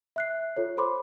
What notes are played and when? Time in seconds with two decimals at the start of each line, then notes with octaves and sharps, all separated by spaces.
0.16 E5 F#6 C7
0.57 F4 A4 C#5
0.77 A4 C5 B5 C6 D6